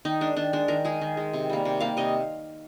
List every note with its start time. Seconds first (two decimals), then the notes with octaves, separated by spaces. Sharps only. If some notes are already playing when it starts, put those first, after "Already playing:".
0.05 D#3 D#4
0.21 G#3 D4
0.36 D#3 D4
0.53 G#3 D4
0.68 D#3 A#4
0.85 G#3 G#4
1.01 D#3
1.17 G#3
1.33 C3
1.49 G3 A#3
1.65 C3
1.81 G3 A#3 F5
1.97 C3 D#5